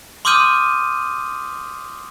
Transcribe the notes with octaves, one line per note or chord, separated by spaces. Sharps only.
C6 D6 D#6 F6 G6 D#7